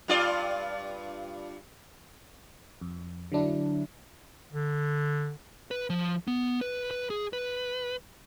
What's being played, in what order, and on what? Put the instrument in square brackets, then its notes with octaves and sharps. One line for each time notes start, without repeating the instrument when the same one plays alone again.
[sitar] G2 F4 D5
[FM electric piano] F2
D3 F#3 D4 E4
[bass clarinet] D3
[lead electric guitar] B4
F3
B3
B4
B4
G#4
B4